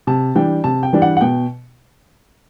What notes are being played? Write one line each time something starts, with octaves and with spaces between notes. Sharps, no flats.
C3 A5
E3 G3 D4 G5
C3 A5
G5
E3 G3 D4
F#5
F#5
B2 G5